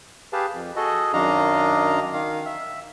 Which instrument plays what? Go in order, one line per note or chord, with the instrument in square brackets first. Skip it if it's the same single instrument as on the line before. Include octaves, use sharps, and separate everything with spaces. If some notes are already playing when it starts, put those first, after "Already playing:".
[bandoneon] G4 G#4 B4 F5 A5
F2
F#4 G#4 A4 D#5
F#2 D#3 D4 D#5 F5 A#5
D#3 F5
E5